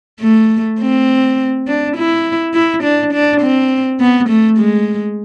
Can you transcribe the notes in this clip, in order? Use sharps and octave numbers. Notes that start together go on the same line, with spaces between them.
A3
C4
D4
E4
E4
D4
D4
C4
B3
A3
G#3